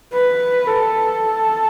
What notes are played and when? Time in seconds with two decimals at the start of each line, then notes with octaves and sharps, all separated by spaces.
0.13 B4
0.67 A4